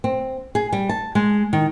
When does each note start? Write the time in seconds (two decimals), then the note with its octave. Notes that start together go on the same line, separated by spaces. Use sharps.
0.04 C4
0.55 G#4
0.73 G3
0.89 A5
1.15 G#3
1.53 D#3